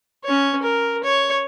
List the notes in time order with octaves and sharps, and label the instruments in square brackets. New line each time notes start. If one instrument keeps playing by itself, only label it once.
[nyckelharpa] C#4 C#5
A#4
C#5